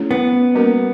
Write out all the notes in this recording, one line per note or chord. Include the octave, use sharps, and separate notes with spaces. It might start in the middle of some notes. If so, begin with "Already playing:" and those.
Already playing: A3 C#4 E4 G#4 C#5
B3
G3 A#3 C#4 F#4 A#4